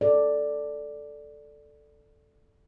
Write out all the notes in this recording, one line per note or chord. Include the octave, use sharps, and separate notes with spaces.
A4 D5